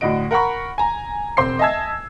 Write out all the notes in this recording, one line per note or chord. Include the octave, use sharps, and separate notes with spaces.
A2 D3 F#4 D#5 D7
A#4 F#5 A#5 B5 C#6
G#5 A#5
E1 C4 C5 C6 D6 C7
D#5 E5 G#5 A5 E6 G#6